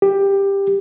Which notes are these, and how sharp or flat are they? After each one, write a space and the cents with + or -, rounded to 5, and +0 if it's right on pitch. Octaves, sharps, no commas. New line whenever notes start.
G4 +15